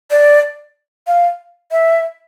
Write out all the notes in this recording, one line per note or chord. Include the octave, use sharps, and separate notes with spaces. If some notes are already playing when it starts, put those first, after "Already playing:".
D5
F5
E5